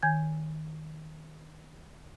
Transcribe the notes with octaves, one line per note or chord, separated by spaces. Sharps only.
D#3 G#5 G6 G#6